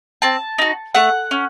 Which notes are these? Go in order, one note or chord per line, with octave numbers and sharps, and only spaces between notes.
C4 A5
D#4 F#4
A3 F#5
C#4